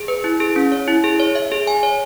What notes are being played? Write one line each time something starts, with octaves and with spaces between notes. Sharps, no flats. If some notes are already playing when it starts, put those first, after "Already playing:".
Already playing: G#4
B4
E4
G#4
C#4
C#5
E4
G#4
C#5
E5
G#4
G#5
C#5